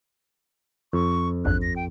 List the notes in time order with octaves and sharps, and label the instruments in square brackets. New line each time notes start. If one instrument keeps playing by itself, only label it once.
[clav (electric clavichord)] F2 [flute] C#6
[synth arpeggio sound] A1 E2 G2 [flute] F#6
[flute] A#6
G5